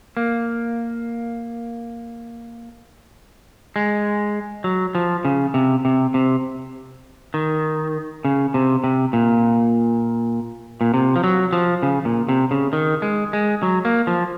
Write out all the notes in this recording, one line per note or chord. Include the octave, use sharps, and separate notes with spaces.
A#3
G#3
F#3
F3
C#3
C3
C3
C3
D#3
C#3
C3
C3
A#2
A#2
C3
F3
F#3
F3
C#3
A#2
C3
C#3
D#3
G#3
G#3
F#3
A#3
F3